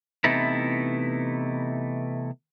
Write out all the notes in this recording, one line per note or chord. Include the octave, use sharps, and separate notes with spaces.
C3 E3 A3 B3 D#4 E4